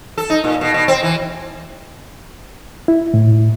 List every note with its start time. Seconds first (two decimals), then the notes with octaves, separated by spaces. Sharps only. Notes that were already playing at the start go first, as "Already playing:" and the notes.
0.18 A4
0.30 D#4
0.44 A#2
0.61 B2
0.74 B2
0.88 C4
1.03 E3
2.88 E4
3.14 A2